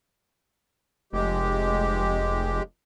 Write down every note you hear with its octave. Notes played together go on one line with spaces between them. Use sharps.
F1 G#3 G4